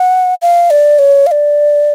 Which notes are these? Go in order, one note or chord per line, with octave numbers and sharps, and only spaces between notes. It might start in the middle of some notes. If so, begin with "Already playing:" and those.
Already playing: F#5
F5
D5
C#5
F5
D5